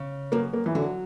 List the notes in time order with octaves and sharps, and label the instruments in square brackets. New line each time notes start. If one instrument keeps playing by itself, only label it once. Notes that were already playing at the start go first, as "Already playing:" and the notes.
Already playing: [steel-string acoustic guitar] C#3
[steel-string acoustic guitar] F#2 [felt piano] A#3
[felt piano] A#3
E3
[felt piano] D3 [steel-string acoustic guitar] F#3